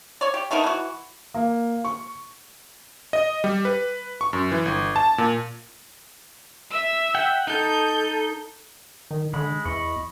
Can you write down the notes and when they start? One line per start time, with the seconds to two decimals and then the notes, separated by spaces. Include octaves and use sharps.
0.21 C#5 D5
0.34 G4
0.51 A3 B3 D#4 A#4
0.64 E3 F#4
1.34 A#3
1.85 C#6
3.13 D#5
3.44 G3
3.65 B4
4.21 C#6
4.33 F#2
4.52 E3
4.66 G1
4.96 A5
5.18 A#2
6.70 E5 E6
7.15 F#5 G5
7.47 D#4 A4 G6
9.11 D#3
9.34 D3 G#3 B5
9.65 E2 D#5 B5 C#6